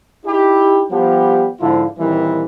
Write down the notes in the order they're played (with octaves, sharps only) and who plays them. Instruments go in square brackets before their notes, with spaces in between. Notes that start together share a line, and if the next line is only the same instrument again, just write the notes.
[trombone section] D#4 E4 G4
F3 G3 B3 G4
G#2 D3 F3 E4 F4
A#2 D#3 E3 G3 C4